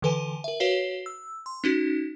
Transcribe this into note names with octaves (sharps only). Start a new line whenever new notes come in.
D3 E3 A4 B4 G#5 D#7
A#4 E5
F#4 B4 C#5 F5 C7 G7
E6
C6
C#4 D#4 F#4